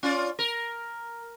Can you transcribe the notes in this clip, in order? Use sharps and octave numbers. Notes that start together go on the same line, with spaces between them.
C#4 F4 D5
A#4